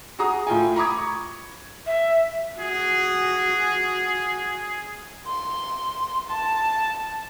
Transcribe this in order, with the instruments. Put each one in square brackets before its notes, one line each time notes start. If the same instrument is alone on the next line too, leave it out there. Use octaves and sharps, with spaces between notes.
[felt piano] F#4 G#4 A#5 D#6
A2 F4 G5 G#5
A#5 B5 D6 D#6 G#6
C#6
[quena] E5
[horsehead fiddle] F#4 [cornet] G#4
[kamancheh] C6
A5